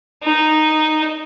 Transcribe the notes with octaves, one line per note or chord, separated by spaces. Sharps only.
D#4